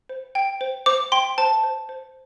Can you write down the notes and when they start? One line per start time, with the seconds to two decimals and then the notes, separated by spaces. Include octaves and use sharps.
0.09 C5
0.35 G5
0.61 C5
0.86 C5 D6
1.12 G5 C6
1.38 C5 A5
1.64 C5
1.89 C5